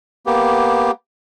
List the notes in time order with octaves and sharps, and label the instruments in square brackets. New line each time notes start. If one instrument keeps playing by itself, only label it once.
[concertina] A#3 B3 G4